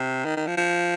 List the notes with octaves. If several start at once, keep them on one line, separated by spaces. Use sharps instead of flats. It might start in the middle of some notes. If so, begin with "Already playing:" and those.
Already playing: C3
D#3
D#3
F3
F3